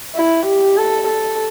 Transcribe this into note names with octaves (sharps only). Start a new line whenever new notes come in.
E4
G4
A4
A4